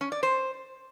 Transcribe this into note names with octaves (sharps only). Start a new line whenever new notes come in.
C#4
D5
C5